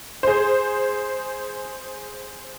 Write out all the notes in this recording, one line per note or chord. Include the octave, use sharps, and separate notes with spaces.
G#4 C5